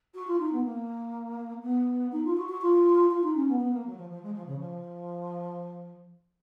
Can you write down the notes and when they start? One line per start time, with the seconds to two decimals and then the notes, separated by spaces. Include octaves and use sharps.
0.14 F#4
0.27 F4
0.39 D#4
0.52 B3
0.64 A#3
1.62 B3
2.12 D#4
2.24 F4
2.37 F#4
2.49 F#4
2.61 F4
3.11 F4
3.23 D#4
3.35 C#4
3.48 B3
3.60 B3
3.73 A#3
3.86 F#3
3.97 F3
4.10 F3
4.22 G#3
4.34 F3
4.46 C#3
4.59 F3